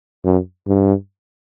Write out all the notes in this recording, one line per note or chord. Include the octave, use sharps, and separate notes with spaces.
F#2
G2